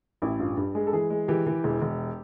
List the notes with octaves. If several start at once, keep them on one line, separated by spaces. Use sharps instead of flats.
A1 E4
G2 F4
G2 G4
G#3 G#4
A4
E3 G#4
G#3
E3 G4
E3
E1
E1